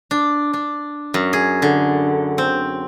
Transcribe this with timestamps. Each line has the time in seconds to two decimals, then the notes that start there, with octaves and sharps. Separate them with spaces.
0.11 D4
0.53 D4
1.14 F#2
1.33 G#4
1.62 D3
2.38 C4